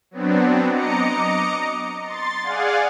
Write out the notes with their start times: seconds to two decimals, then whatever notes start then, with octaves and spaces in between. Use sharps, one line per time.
0.11 F#3 B3 C4 D4
0.70 D#5 A#5 D6 C#7
2.04 C6 A6
2.43 G#4 D5 F5 F#5 G#5